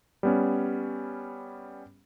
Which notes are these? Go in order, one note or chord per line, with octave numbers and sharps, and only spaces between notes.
G3 B3 C#4